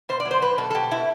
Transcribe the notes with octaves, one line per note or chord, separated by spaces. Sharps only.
B2 C5
D5
F#3
C5
F#3 B4
B2 A4
A4
B2 G4
B2 E4